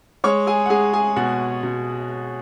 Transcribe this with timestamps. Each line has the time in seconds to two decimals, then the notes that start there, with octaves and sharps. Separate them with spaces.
0.24 G#3 C#5 C#6
0.47 G#4 G#5
0.66 F#5
0.70 G#3 G#4 G#5
0.93 G#4 G#5
1.16 B2 F#4 F#5
1.63 B2